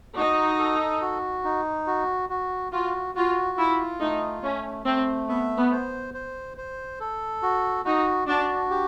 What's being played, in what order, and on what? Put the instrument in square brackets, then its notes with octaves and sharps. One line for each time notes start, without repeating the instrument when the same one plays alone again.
[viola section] D#4 [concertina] F#4
[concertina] A4
F#4
D#4
F#4
F#4
[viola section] F4 [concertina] F#4
[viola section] F4 [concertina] F#4
[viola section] E4 [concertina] F4
[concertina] A3 [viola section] D#4
[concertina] A3 [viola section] C#4
[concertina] A3 [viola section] C4
[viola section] B3 [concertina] E5
[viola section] B3
[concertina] C5
C5
C5
A4
F#4
[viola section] D#4 [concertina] F#4
[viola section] D4 [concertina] F#4
[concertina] G4